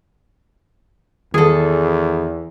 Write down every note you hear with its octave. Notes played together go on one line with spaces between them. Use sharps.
E2 D#3 G#4 A4